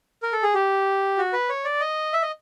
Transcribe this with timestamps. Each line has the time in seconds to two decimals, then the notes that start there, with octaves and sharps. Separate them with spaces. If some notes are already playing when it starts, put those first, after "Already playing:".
0.23 A#4
0.33 A4
0.43 G#4
0.54 G4
1.18 F#4
1.33 B4
1.49 C#5
1.64 D5
1.81 D#5
2.13 E5
2.22 D#5